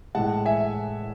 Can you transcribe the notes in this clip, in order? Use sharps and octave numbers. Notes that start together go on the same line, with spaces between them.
A2 E3 G#3 F#5 A5
E5 G#5